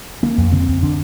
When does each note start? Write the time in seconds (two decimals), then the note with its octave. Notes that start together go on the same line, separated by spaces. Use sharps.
0.23 D3 A#3
0.38 F2
0.52 D3 C4
0.68 F2
0.83 D3 D4